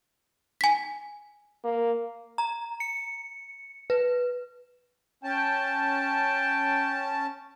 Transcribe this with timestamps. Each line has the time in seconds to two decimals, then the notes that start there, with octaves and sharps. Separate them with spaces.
0.61 G#5 B6
1.64 A#3
2.38 A#5
2.80 C#7
3.90 B4
5.24 C#4 G5 A5